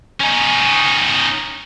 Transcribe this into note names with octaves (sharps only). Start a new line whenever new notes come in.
C#4 D#4